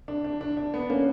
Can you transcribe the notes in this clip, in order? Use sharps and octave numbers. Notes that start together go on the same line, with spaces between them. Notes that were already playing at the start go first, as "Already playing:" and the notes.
D4
D4
D4
D4
B3
A#3 C#4